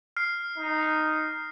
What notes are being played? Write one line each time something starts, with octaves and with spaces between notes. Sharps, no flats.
F6 C7
D#4